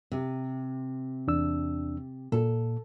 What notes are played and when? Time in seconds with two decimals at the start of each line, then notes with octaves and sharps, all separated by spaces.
0.12 C3
1.27 E2 D4 E6
2.32 A#2 A4